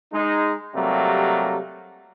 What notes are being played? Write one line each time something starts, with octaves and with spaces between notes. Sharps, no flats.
G#3 D#4
C3 F#3 G3 A3 A#3